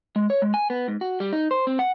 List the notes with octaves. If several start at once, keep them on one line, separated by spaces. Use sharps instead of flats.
G#3
C#5
G#3
G#5
B3
G#2
F#4
G3
D#4
C5
C4
F#5